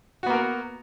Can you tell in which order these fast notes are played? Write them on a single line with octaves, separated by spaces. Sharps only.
F#4 B3 A#3 A#4